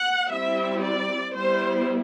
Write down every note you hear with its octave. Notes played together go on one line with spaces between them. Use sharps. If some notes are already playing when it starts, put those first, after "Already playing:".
Already playing: F#5
G3 C4 E4 E5
D5
G3 B3 E4 C5